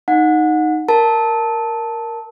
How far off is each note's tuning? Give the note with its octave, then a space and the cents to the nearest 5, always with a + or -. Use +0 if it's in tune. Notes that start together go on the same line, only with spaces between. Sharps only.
D#4 +0 F#5 -25
A#4 +0 A5 +0